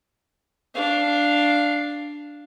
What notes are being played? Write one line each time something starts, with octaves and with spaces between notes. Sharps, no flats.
D4 F5